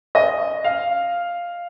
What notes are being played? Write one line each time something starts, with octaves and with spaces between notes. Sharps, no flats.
D#5
F5